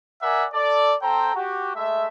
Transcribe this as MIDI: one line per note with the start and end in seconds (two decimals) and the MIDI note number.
0.22 0.46 70
0.22 0.46 74
0.22 0.46 76
0.22 0.46 78
0.22 0.46 80
0.54 0.94 69
0.54 0.94 74
1.02 1.34 60
1.02 1.34 69
1.02 1.34 72
1.02 1.34 79
1.02 1.34 82
1.36 1.71 66
1.36 1.71 67
1.76 2.06 56
1.76 2.06 57
1.76 2.06 76